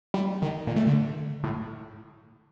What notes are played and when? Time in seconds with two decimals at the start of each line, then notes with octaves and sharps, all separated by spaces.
0.14 G3
0.42 D#3
0.67 A#2
0.76 A3
0.87 D3
1.44 A2